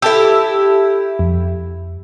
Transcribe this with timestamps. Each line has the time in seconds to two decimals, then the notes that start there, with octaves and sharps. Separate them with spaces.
0.02 E4 G4 A4 A5 E6
1.19 F2